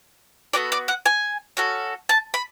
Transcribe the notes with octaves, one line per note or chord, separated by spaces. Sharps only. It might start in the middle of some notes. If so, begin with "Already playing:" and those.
B3 F#4 A4 D5
D5
F#5
G#5
C#4 F#4 A4
A5
B5